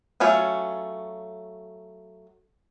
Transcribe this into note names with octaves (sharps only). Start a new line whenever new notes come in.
F#3 A3 C#4 F4